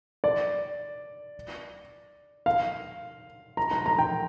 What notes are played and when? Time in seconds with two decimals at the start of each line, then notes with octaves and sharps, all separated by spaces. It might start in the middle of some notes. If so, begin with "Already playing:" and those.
0.24 D5
2.46 F5
3.57 A#5
3.71 A#5
3.86 A#5
3.99 G5